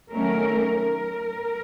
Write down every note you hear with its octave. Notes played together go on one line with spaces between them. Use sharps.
D#3 F#3 A3 C#4 A#4
A#4